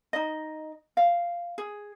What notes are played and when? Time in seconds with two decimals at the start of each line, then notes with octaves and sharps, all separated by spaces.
0.13 D#4 D#5
0.97 F5
1.58 G#4